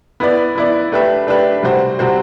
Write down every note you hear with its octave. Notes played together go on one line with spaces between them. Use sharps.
B3 E4 B4 D5
B3 E4 B4 D5
A3 D4 G4 B4 E5
A3 D4 G4 B4 E5
C3 G3 C4 F#4 C5
C3 G3 C4 F#4 C5